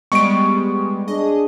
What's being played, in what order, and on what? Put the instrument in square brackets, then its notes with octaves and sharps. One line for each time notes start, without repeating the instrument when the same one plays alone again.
[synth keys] G3 G#3 B3 [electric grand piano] C#6 D7
[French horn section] D4 G#4 [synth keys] D#5